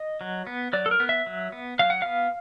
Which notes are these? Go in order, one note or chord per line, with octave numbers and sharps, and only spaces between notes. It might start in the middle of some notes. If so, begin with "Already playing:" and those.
Already playing: D#5
F#3
B3
F#3 D5
A4
A#4
B3
E5
F#3
B3
F#3 F5
F#5
B3 F5